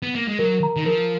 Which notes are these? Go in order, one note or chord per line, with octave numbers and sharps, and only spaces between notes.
B3
A#3
G#3
F#3 A#4
A#5
D#3
F3 A#4